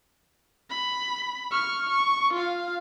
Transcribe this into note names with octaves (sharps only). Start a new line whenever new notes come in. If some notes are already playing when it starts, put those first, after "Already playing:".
B5
C#6 F6
C#6
F4 F5